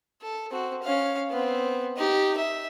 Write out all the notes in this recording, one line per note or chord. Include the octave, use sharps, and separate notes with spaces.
A4
C4 F#4
C#4 F5
B3 C4
D#4 G4
E5